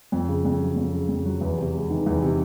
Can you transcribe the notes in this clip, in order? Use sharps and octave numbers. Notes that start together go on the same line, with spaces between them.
F2
C#3
F2
F#3
F2
C#3
F2
F#3
E2
C3
G#3
D#3
E2
C3